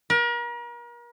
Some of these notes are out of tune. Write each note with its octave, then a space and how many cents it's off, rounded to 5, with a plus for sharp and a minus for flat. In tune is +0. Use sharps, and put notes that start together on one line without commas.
A#4 +40